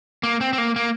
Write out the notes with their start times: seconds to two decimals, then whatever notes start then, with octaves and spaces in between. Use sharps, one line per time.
0.23 A#3
0.41 C4
0.53 C4
0.58 A#3
0.76 A#3